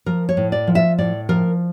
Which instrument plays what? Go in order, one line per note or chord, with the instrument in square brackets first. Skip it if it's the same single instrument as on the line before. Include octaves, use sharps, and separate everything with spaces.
[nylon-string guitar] F3 A#4
C#5
A2
D5
F3
E5
A2 D5
F3 A#4